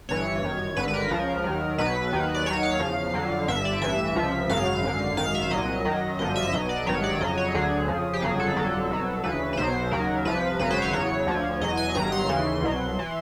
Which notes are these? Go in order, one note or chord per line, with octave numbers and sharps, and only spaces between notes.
G1 G2 E3 C#5
G1 F#2 D#3
G#1 G2 D3 B4
B4
A#4
C#2 C#3 F3
D#2 D#3 F#3
B1 B2 F#3 B4
D#2 D#3 F#3
D5
D#2 D#3 F#3 C#5
F5
E2 C#3 F3
F2 D3 F#3
G1 G2 D3 E5
D5
A1 G2 E3 E5
C#2 C3 F3
G#1 F#2 C#3 F#3 F5
G#1 F#2 D3
G#1 F#2 D#3 F5
E5
C2 A#2 F#3 D#5
F#2 D#3 F#3
G1 F#2 D3 F3 D#5
E5
B1 B2 F#3 D#5
D5
G#1 G2 D#3 F#3 C#5
D5
F2 C#3 F#3 D#5
C#5
D2 D3 F#3 G#4
F2 C#3 F3
G4
G1 F2 C#3 F#3 G#4
A4
G1 F2 D3 F#3
C2 B2 F#3
D2 C#3 E3 B4
B4
B1 B2 F#3 C5
D#2 C#3 F#3 A#4
C2 C3 F3 B4
G#1 F#2 C#3 F#3 B4
C5
C#5
E2 C#3 F#3 C#5
D2 D3 F3
E2 B2 F#3 D#5
G#5
G1 G2 D#3 F#3 A#5
C6
D#2 C#3 E3 C6
C2 B2 F#3
E3